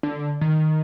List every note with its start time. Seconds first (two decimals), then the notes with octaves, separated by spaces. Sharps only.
0.03 D3
0.41 D#3